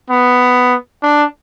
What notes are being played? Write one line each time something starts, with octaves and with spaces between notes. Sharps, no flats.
B3
D4